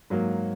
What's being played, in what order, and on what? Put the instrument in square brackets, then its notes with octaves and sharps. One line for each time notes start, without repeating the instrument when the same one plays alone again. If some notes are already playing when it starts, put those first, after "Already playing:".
[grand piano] G#2 F#3 A#3